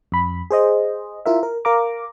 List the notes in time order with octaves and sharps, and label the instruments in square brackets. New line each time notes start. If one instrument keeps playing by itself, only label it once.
[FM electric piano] F2 B5
G#4 C5 D#5
E4 F4 A#4 E5
A#4
A#4 F5 A#5 D6